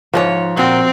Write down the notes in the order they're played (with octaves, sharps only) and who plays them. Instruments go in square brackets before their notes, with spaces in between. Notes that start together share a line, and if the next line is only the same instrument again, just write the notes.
[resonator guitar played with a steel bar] G#2 G#4 C#5 [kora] F3
[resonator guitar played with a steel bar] A#2 F#4 [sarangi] C4